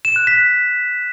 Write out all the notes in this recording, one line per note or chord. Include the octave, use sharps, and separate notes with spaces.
E7
F#6
B6